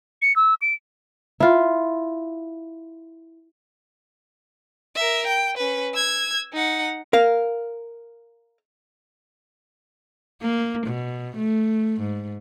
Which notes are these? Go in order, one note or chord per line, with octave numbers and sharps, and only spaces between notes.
C#7
E6
D7
E4 F4
A#4 E5
G5
C#4 B4
E6 G#6
D#4 F#5
A#4 F5
A#3
B2
A3
G#2